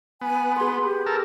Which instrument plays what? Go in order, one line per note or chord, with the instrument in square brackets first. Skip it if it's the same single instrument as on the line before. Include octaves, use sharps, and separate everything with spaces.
[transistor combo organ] B3 [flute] G#5
[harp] G#4 B4 [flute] C6
[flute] G4
[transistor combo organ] A4 A#4